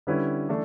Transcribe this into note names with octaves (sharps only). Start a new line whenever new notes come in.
D3 G3 C#4 E4 B4
E3 A3 D4 A4